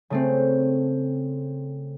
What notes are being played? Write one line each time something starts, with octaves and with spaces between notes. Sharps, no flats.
C#3 A3 C4